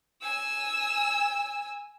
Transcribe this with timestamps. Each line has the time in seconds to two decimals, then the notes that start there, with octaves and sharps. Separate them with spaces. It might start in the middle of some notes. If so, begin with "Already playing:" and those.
0.22 G#5 E6